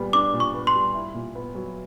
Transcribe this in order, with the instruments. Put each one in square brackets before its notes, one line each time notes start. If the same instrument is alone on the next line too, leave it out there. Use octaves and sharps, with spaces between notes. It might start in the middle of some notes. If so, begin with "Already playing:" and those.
Already playing: [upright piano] A#2 G3 B3
[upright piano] D4 [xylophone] D6
[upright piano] A#2
[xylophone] C#6
[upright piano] B3
[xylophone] C6
[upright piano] G3
E4
A#2
B3
F#3